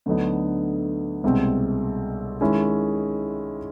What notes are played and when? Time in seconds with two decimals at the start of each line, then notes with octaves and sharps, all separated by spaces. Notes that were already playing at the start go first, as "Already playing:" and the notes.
0.06 D2 D3 F#3 B3 D#4
1.24 C2 B2 G#3 C4
2.41 D#3 G#3 C#4 E4